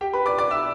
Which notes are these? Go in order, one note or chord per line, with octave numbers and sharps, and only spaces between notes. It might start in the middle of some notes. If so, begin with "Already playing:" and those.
G4 G5
B4 B5
D5 D6
D5 D6
E5 E6